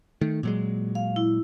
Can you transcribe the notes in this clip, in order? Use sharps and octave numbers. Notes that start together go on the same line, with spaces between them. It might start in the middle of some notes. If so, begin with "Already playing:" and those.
D#3 A3
A#2 F#3 G#3
F5
E4